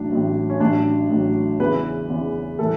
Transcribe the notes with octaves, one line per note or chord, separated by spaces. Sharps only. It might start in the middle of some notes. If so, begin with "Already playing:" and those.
Already playing: A1 A2 F#3 D4
A1 A2 F#3
C#4
A1 A2 F#3 D4
A1 A2 F#3
E2 C#3 E3 B4
E2 C#3 E3
A2 E3 G3 A4